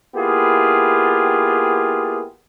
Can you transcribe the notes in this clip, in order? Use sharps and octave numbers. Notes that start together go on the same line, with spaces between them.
A#3 B3 E4 F4 G4 G#4